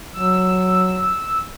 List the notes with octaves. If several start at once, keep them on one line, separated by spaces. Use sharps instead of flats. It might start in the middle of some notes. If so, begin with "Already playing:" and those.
F#3 E6